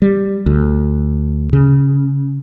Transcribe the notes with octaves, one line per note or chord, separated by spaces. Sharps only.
G3
D2
C#3